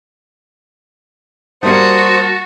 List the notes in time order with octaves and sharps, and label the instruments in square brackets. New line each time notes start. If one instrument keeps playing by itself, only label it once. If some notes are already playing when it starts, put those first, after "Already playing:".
[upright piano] G3 A#3 C#7 [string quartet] F#4 [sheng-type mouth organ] C5 D#6 [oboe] A5